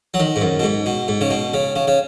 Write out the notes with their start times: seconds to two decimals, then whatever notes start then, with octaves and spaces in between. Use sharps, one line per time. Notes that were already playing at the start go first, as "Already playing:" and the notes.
0.14 F#3
0.20 D#3
0.36 G#2
0.41 F#2
0.59 B2
0.63 G#2
0.86 B2
1.08 G#2
1.21 C#3
1.31 B2
1.54 C#3
1.76 C#3
1.88 C#3